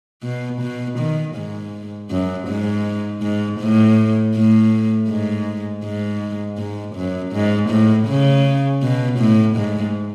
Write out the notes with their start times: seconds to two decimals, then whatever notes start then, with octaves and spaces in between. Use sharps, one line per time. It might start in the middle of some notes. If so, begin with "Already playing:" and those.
0.23 B2
0.61 B2
0.98 D#3
1.35 G#2
2.10 F#2
2.48 G#2
3.22 G#2
3.60 A2
4.34 A2
5.09 G#2
5.83 G#2
6.58 G#2
6.95 F#2
7.32 G#2
7.70 A2
8.07 C#3
8.82 B2
9.19 A2
9.56 G#2